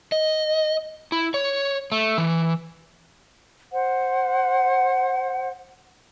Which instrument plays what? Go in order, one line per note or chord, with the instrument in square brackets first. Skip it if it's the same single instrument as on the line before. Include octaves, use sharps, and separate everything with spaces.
[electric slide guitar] D#5
E4
C#5
A3
E3
[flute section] C5 F#5